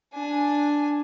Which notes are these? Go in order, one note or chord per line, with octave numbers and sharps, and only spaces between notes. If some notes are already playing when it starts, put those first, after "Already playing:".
D4 G#5